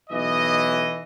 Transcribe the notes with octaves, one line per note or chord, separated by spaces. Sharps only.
B1 E3 D#5